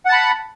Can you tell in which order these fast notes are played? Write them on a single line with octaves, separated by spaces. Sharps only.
F#5 A5 B5